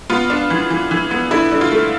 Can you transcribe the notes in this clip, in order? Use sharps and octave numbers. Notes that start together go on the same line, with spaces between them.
B3 F4
D4
E3
E3
E3
B3
D3 E4
D3
F4
A3